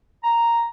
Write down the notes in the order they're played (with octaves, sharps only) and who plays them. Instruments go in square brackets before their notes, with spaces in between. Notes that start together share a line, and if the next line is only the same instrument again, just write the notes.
[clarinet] A#5